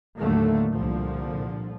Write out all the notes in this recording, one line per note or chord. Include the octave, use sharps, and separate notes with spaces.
D#2 A2 D3 F#3 A3 A#3
C2 A#2 D3 F3